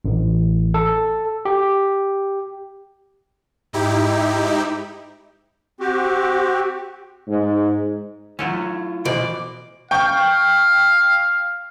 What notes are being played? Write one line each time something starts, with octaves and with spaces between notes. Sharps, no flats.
A1
A4
G4
G#2 D#4 E4 G4
C4 F#4 G4
G#2
F#3 A3 C#4 E4 F4
B2 E3 F3 D5
F5 G5 C#6